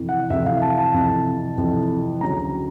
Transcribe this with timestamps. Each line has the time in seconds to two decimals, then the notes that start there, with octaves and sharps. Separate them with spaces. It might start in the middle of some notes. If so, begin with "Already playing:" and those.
Already playing: F2 C3 E3
0.09 F#5
0.30 F2 C3 E3 E5
0.46 F5
0.62 A5
0.78 A5
0.94 F2 C3 E3
1.58 F2 C3 E3
2.21 D2 C#3 F#3 A#5